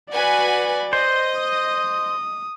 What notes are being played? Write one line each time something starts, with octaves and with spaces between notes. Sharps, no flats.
F#4 B4 D5 G#5
C5 D#5
D#6